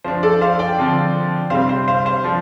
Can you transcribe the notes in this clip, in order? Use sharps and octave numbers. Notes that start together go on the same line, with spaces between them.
F3 D4 C5
A4 D5
C5 F5
D5 G5
D3 F3 C4
C3 G3 C4 C5 F5
C5
C5 F5
C5 F5
F3 D4